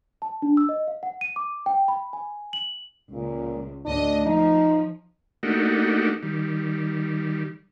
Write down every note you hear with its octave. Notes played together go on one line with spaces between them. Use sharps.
A5
D4
E6
D#5
F5
F#5
D#7
D6
G5
B5
G#5
F#7
C#2 A#2
D2 A2 D4 D#5
F3 D#4
A3 A#3 D4 D#4 F#4 G4
D#3 G3